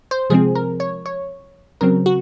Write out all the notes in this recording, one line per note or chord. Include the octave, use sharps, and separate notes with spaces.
C5
C3 F3 G#3 C4 G#4
A#4
C#5
C#5
C#3 F#3 C4 A#4
F#4